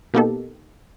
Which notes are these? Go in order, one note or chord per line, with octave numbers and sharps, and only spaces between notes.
B2 A#3 B3 D#4 G4 A4